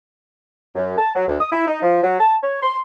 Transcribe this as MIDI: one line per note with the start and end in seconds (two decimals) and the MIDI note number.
0.75 0.96 42
0.97 1.11 81
1.15 1.25 54
1.28 1.39 38
1.40 1.49 87
1.52 1.65 64
1.67 1.82 63
1.82 2.01 53
2.03 2.19 54
2.20 2.36 81
2.43 2.60 73
2.63 2.79 84